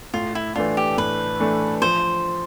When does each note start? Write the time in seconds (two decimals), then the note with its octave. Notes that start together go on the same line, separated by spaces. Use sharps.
0.14 A2 F4
0.35 E4
0.56 E3 A3 D4 F4
0.77 G4
0.97 A2 B4
1.40 E3 A3 D4
1.82 F3 C5